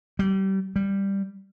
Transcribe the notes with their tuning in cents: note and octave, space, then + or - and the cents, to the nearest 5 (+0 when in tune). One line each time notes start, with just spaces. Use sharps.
G3 -30
G3 +5